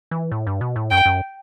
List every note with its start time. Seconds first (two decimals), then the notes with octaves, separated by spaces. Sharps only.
0.11 E3
0.32 A2
0.47 G2
0.61 B2
0.76 A2
0.91 F#2 G5
1.06 F#2